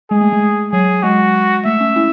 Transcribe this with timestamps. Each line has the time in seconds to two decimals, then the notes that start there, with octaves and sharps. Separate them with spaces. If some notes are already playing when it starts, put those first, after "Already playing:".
0.11 G#3 G#4
0.21 A3
0.33 G#3
0.72 F#3 G#4
1.03 G#3 F#4
1.65 A3 E5
1.81 C#4
1.96 C#4 E4